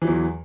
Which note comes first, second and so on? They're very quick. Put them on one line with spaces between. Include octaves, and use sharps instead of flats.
E3 F#3 E2